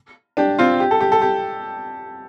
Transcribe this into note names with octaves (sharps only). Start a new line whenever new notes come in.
D4 G4
C4 F4
G4
A4
G4
A4
G4